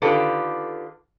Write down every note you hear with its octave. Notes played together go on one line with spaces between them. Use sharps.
D3 D#3 F4 G4 A4 B4